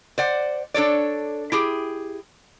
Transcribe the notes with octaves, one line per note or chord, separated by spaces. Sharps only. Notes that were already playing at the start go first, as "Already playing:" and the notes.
C5 D5 F#5
D4 A4 C#5 D5
E4 G4 G#4